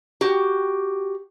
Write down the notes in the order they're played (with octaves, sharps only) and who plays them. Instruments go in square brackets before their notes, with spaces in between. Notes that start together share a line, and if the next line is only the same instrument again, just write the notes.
[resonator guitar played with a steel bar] F#4 G4